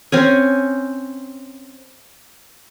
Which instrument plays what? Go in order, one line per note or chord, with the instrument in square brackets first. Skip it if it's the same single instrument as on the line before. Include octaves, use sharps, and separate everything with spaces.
[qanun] C4 C#4 G#5